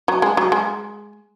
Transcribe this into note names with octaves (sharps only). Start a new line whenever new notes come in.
F#3
G#3
F#3
G#3